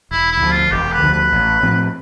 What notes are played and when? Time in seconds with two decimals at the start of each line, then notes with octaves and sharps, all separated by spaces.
0.11 E1 E4
0.31 E4
0.41 D2 D3 F3
0.52 F4
0.71 E1 G4
0.92 B4
1.02 D2 D3 F3
1.12 B4
1.32 A1
1.63 A2 F3 C4